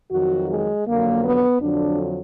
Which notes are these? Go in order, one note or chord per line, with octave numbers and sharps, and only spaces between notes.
F2 D#3 F#3 F#4
G#3
F2 D3 F#3 A#3
B3
F2 D3 F#3 D4